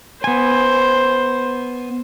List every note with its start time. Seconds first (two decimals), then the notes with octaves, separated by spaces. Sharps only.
0.24 B3 C5 G#5